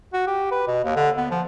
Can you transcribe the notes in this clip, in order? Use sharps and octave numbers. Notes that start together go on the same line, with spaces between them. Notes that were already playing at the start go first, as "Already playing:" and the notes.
F#4
G4
B4
B2
D#2
D3
B3
F3